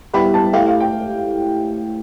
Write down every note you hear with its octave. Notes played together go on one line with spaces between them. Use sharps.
G3 B3 E4 G4 B4 B5
A5
A3 E4 G4 F5
F5
G5